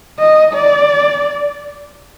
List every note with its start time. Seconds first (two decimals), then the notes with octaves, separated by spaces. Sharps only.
0.19 D#5
0.54 D5